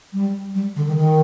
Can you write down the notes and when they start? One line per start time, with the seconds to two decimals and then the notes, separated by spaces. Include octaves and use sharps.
0.13 G3
0.55 G3
0.76 D3
0.87 D#3
0.97 D#3